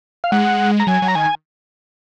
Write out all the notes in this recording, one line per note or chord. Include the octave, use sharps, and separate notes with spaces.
F5
G#3 F#5
A#5
F#3 G#5
F#3
A#5
D#3 G#5